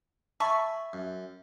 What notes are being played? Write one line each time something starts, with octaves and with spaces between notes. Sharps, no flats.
E5 G#5 A5 B5 C#6
F#2